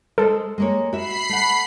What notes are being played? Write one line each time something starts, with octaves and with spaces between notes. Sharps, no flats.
G#3 A4 C5
G#3 A#3 C#5
F#4 E5 B5 C7
A3 F#5